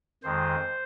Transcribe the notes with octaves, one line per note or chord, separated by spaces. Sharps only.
F2 D#3 G#3 C5